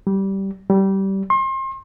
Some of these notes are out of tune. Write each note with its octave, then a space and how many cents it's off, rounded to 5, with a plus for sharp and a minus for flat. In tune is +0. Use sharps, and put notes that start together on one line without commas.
G3 -15
G3 -20
C6 +35